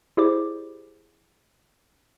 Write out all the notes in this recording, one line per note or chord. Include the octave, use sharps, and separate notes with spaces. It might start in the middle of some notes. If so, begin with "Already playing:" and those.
E4 G4 G#4 C5 D5 D6